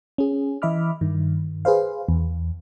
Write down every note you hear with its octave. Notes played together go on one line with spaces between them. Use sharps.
C#4 G#4
E3 D#5 E5 B5 D6 F6
G2 D#3
G#4 B4 C5 F5
E2